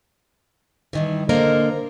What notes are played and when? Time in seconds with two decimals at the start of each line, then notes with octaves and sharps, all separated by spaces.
0.93 G2 D#3 E3
1.29 D3 A#3 A#4 C5 D#5